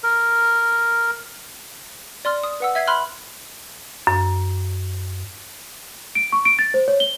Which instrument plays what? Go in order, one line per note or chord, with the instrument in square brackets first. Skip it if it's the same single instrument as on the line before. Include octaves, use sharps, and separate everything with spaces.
[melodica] A#4
[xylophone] D5 C6 F6
D#6
B4 F#5 E6
E5 G#6 B6 C7
B5 C6 F6 F#6
[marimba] F#2
[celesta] D7
C#6
D7
A6
C5
C#5
G7